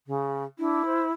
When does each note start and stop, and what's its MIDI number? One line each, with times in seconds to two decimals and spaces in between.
0.07 0.44 49
0.59 0.83 62
0.59 1.12 64
0.85 1.05 72